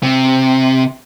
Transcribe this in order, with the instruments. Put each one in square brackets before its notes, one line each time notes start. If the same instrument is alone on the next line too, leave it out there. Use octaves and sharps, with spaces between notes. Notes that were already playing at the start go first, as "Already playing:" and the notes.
[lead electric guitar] C3